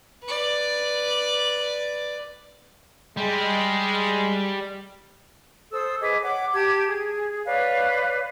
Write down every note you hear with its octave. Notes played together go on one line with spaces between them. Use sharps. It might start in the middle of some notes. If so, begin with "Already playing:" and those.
B4 D5
G3 G#3
A4 C5 D#6 E6
G#4 B4 D#5 D6
C#5 F#5 D6
G4 A5 G#6
G#4
B4 C#5 D5 F5